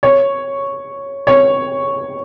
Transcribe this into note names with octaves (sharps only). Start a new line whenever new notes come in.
C#5
C#5